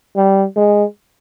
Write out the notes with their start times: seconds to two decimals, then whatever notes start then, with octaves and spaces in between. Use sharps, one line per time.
0.16 G3
0.56 G#3